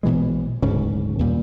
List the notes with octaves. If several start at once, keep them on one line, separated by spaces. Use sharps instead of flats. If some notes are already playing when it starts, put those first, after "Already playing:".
A#1 B2 E3 G#3
D1 G#2 C#3 C#4
D#2 A#2 G3